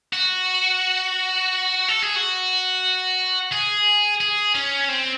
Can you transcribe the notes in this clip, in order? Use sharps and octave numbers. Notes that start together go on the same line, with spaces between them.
F#4
A4
G#4
F#4
G#4
G#4
C#4
C4